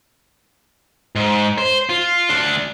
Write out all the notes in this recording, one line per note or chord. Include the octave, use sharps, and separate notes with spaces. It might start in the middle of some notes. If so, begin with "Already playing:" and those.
G#2
C5
F4
D2 D4